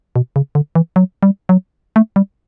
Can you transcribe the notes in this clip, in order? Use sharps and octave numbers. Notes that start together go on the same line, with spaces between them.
B2
C#3
D3
E3
F#3
G3
F#3
A3
G3